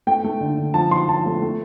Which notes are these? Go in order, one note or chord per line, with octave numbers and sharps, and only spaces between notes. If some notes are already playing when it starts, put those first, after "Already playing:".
A3 G5
A3
D3
D3
F3 A5
F3 C6
F3 A5
A3
A3